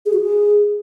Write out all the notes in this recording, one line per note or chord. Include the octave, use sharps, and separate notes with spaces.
G#4
F#4
G#4